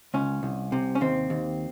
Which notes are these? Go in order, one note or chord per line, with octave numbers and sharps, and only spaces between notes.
C#2 C#4
C2
C3
C#4
D#2 C4
D#2